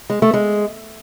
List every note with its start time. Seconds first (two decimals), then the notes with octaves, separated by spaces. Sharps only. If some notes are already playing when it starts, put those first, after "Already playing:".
0.10 G#3
0.22 A3
0.34 G#3